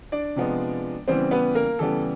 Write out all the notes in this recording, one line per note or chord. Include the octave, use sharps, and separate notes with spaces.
D4 D5
C3 F3 G#3 B3
C#3 E3 G3 B3 C4 C5
B3 B4
A#3 A#4
C#3 E3 G3 B3 A4